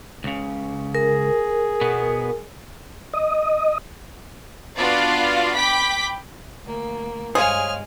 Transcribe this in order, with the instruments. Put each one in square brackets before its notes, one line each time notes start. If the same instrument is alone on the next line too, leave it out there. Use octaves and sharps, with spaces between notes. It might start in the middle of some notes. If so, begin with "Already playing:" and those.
[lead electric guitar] C#2 C#3
[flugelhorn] G#4 [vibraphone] A#4
[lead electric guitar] B2 B3
[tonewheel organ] D#5
[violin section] B3 D4 F4 F#4 D5 F5
G5 B5 D6 B6
[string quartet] D2 A#3
[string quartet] G2 G#3 [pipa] G#4 [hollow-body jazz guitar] C5 C#5 F5 [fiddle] G#5 F6